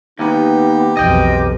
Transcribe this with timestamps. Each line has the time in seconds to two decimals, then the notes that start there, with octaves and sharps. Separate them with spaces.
0.19 D#2 B3 D#4 G4
0.97 B1 F2 E3 D#5 G5